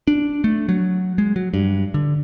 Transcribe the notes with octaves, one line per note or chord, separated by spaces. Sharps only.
D4
A3
F#3
G#3
F#3
G2
D3